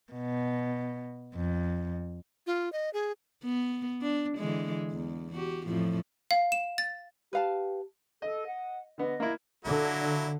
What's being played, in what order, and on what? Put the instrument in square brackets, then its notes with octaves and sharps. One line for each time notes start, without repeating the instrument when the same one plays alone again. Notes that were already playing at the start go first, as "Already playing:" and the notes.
[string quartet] B2
F2
[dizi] F4
D#5
G#4
[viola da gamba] B3
D4
D3 E3 G#3
E2
F#4 G4
F2 A2 F3
[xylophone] F5
E7
A6
[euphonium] G4 [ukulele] B4 F5 A5
[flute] A4 [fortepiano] D#5
[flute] F#5
[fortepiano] D3 B3 [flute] D#5
[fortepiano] A#3 E4
[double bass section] D3 [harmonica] F#3 A#3 E4 [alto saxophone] A4